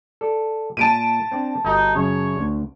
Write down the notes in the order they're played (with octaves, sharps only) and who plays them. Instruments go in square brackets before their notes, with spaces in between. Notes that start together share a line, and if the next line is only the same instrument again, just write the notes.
[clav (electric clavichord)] A4 D5
[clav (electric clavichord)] A#2 [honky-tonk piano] A5 D7 D#7
[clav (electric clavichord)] C4 D4 D5
[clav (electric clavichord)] G1 F#4 D#5 [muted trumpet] D#4
[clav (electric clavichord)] F#2 C#3 [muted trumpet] C#5
[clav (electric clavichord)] D2